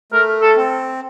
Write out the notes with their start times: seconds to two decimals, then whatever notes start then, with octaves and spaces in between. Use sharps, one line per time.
0.12 A3 A#4
0.42 A4
0.56 C4